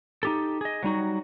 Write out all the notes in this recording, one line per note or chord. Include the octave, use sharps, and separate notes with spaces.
D#4 G4 A4
G#4 D#5
F#3 G3 D#4 F#4